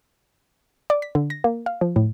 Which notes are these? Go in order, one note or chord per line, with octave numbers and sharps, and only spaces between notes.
D5
B6
D3
A#6
A#3
F5
F3
A2